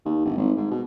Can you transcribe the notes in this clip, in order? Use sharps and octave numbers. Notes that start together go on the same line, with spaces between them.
D#2
G1
G#1
G#2
B2